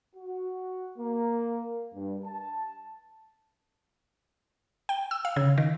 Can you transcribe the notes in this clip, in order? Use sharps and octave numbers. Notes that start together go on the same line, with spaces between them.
F#4
A#3
G2
A5
G5
E6
F5
C#3
D#3